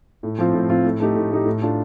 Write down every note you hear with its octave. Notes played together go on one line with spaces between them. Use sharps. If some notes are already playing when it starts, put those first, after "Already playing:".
A2
F3 C4 F4
A2
F3 C4 F4
A2
A3 D#4 G4
A2
A3 D#4 G4
A2
A3 D4 F4